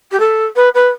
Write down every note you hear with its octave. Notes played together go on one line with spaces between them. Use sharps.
G4
A4
B4
B4